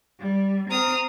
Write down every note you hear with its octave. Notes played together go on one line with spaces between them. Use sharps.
G3
C4 A#5 D#6 F6